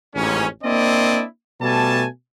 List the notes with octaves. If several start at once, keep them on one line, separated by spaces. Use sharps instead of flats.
A1 F2 G#2 C#4
A#3 C4 D4 E4 D5 D#5
B2 G3 A3 G#5 A5